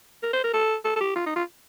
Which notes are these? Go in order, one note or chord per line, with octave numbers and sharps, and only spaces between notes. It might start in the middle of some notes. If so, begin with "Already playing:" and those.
A#4
C5
A#4
A4
A4
A4
G4
F4
D#4
F4